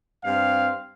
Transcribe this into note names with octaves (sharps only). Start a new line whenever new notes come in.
G2 C4 F5